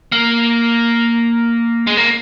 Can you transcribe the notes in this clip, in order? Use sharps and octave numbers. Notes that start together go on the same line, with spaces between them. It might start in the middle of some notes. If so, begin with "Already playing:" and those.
A#3
G#3
A#3